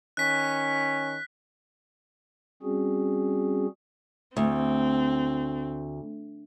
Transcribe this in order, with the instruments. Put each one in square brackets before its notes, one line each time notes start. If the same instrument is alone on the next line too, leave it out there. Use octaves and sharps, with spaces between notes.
[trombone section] D#3 C#4 [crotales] F#6 B6
[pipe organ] G3 C4 C#4 F#4 G#4
[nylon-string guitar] D2 [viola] C4